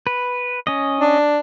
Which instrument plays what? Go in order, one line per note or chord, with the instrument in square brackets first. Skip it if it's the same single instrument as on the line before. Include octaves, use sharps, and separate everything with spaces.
[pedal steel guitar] B4
C#4 D#5
[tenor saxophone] D4